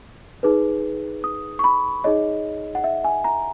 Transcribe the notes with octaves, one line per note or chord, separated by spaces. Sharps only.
D#4 G#4 B4
D#6
C#6
B5
D#4 G#4 C#5 D#5
F#5
E5
G#5
A#5